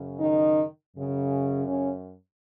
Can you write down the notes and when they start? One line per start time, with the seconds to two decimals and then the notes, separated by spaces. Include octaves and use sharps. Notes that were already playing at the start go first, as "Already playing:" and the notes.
Already playing: F#2 C#3
0.20 D#3 D#4
0.95 F#2 C#3
1.68 C#3 C#4